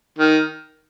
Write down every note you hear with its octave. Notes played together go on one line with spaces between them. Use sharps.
D#3